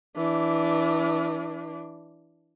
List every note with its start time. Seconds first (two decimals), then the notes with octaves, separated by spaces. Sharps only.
0.16 E3 D4